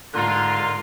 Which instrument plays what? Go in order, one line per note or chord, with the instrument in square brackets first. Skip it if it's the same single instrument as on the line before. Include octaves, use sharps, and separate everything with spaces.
[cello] G#2 A#4 [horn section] D3 F4